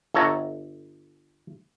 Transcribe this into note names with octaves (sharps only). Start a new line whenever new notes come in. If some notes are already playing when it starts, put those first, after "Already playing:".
G1 A4 C#5 A#5